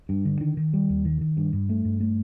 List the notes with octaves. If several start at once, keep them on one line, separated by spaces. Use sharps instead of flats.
G2
D3
D#3
D#3
G3
D#2
D#3
D#3
G2
G2
A3
G2
A3